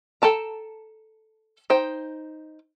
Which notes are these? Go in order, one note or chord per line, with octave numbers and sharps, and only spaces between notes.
A4 G5 A5 A#5
D#4 C5 G5